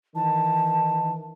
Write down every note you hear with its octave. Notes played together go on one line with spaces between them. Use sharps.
D#3 E3 A5